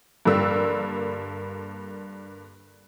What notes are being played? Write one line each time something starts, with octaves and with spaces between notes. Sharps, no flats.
G2 D3 G3 A#3 E6